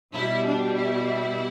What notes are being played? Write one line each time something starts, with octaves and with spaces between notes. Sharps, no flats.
B2 G3 E4
D4
E4